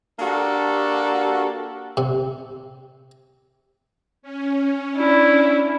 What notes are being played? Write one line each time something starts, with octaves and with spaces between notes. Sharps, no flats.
A#3 D4 F#4 G4 A4
C3
C#4
D4 E4